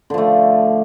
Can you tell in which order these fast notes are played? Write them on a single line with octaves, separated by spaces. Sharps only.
D3 F3 A3